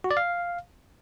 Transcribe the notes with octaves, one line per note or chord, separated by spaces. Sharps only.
F#4
D5
F5